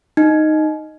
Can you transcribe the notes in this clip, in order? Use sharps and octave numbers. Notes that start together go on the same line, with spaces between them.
D#4